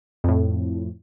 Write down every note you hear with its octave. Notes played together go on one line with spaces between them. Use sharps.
F2 A2